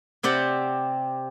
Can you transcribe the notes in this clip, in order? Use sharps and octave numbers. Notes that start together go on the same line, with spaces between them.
C3 C4 G4 D5 F#5